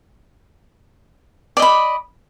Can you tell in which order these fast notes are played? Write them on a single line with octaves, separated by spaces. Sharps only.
D5 D#5 B5